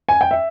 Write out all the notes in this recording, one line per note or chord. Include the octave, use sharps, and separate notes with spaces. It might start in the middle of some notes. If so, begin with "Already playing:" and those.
G#5
G5
E5